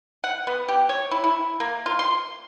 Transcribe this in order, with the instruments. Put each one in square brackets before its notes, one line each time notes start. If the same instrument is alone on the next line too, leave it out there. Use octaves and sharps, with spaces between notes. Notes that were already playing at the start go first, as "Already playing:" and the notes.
[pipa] F#5
B3
G4
C#5
E4
E4
A#3
F4
C6